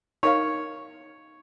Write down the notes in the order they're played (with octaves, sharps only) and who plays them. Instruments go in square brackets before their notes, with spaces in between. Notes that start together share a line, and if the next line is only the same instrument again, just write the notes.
[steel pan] D#4 A#4 F5 [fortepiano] C#5